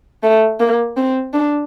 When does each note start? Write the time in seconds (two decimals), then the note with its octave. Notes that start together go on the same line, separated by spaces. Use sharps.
0.23 A3
0.60 A#3
0.97 C4
1.33 D4